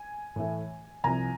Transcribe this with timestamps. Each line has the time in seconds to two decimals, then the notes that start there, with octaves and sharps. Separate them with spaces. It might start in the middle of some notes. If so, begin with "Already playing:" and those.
Already playing: G#5
0.36 A2 E3 A3
1.04 C2 C3 F3 G#5 A#5